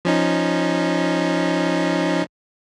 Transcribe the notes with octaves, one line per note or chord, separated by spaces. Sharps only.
F3 C#4 D#4